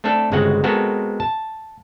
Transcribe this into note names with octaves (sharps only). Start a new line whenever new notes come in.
A3 C4 D4 A4
G1 C#3 G#3 C4 F#4 F#5
G#3 B3 C4 F#4 A4 A#4
A5